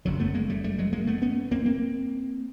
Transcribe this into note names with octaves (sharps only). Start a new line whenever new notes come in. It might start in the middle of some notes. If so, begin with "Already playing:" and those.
F#1 F#2 D3 F#3
A3 B3
G#3 A#3
G3 A3
G3 A3
F#3 G#3
G#3 A#3
A3 B3
B3 C#4
A#3 C4
A#3 C4